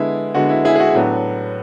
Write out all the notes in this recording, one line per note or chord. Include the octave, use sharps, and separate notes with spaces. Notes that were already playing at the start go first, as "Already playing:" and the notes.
Already playing: D3 G#3 B3 E4
D3 G#3 B3 F#4
E4
E4 G#4
G#4
F#4
A2 F#3 B3 D4